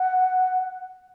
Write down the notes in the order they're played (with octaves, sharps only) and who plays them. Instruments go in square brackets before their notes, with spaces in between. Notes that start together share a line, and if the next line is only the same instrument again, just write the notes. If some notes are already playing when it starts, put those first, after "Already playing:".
Already playing: [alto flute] F#5